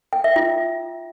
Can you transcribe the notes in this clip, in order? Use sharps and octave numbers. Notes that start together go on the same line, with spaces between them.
G5
E5
F4